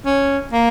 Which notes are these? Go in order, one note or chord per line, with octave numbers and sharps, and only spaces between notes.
C#4
A#3